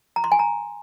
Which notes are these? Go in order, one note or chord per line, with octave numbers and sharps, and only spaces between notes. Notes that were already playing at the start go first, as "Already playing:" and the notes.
A#5
C6
G#5
A#5